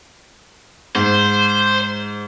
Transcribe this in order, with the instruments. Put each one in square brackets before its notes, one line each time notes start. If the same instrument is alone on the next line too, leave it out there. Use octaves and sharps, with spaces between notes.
[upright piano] G#2 [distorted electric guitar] C5